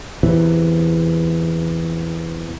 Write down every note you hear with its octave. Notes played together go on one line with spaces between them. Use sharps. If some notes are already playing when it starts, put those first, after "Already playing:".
E2 C3 E3